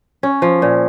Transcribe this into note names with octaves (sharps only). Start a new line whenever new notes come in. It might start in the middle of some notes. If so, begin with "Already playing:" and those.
C#4
F3
A#2